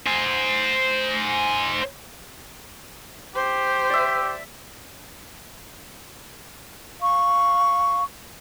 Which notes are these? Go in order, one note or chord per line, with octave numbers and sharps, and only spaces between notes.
C5 G#5
G4 C5
D5 E5
F5 C#6